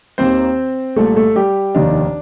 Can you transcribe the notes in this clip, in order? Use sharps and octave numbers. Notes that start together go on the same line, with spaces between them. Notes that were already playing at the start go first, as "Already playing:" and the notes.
D#2 D#3 A#3 C4 C5
C2 A#2 A3 A4
A3 A4
G3 G4
F1 D#2 D#3 D4